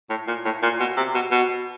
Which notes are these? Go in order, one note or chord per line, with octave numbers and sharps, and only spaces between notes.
A2
A#2
A2
A#2
B2
C3
B2
B2